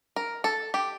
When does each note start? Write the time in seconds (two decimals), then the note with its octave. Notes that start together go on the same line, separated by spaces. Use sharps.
0.16 A#4
0.44 A4
0.74 G4